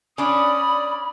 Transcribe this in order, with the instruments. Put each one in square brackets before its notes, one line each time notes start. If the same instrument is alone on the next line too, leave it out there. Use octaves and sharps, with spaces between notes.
[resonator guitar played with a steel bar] C#4 D4 [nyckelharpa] D5 D#6 [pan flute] B5